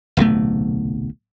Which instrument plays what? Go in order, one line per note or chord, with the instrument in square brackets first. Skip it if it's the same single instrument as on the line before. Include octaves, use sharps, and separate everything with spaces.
[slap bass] D1 B1 C3 A3